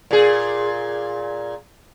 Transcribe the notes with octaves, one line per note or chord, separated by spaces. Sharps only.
A#2 G#4